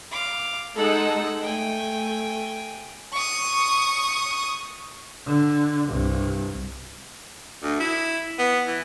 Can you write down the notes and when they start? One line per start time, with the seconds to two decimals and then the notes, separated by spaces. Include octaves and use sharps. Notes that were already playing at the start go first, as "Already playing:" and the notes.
0.11 F5 D6
0.75 G#3 D#4 G#4 A4 F#5
1.41 A3 G5 G#5
3.13 C#6 D#6
5.27 D3
5.88 C2 G2
7.63 D2
7.80 E4
8.39 B3
8.67 E3